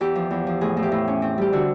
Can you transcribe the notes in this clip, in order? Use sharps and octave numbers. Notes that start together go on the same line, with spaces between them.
E2 G4
F3
E2
F3
A2 G#4
A2
G4
A2
C#4
C4
G3 G4
D3 F#4